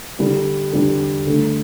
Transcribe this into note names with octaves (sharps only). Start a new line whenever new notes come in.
D3 G3 D4
D3 G3 D4
D3 A3 D4